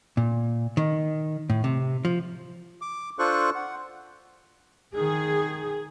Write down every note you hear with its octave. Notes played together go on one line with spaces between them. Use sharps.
A#2
D#3
A2
C3
F3
D6
D4 F4 A4 C5 C#6 F#6
F#5
D#3 G#4